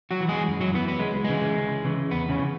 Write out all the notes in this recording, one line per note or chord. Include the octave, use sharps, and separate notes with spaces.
F#3 F#4
E3
G#3 G#4
F#2
F#3 F#4
E3 B3
B3
C#2 G#3
C#3 E3 G#3
C#2
C#3 E3
E2 B3
C#3 C#4
E3